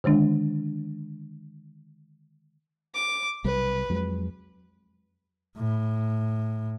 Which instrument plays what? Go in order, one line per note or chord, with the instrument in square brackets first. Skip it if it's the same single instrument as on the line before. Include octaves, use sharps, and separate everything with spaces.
[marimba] D3 D#3 G#3 D4
[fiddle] D6
[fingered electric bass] B1 C3 G3 [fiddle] B4
[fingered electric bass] F2 F#3 G#3
[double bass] A2